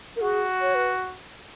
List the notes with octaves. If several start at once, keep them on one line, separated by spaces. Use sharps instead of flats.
A#4
F#4 G#4
C#5
B4